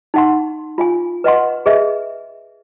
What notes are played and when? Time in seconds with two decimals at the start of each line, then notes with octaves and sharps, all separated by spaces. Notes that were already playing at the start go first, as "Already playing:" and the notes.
0.14 D#4 F#5 C6
0.78 F4 F5 G#5
1.24 B4 D#5 F#5 C6
1.66 G#4 B4 D#5 E5